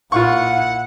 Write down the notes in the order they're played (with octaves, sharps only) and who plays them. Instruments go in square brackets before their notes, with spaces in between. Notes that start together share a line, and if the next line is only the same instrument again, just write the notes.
[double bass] A#2 E4 [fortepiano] F4 C#6 [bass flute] F5 [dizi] F#5